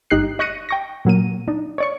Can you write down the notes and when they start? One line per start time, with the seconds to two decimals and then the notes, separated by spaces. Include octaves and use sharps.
0.10 G1 D#4 G4 F#6 C7
0.39 D#5 C#6 F#6 A#6 C#7 D#7
0.69 G5 C#6 A#6
1.05 A#2 F#3 A#3 D#7
1.48 D4 D#4
1.78 C#5 D5 C#6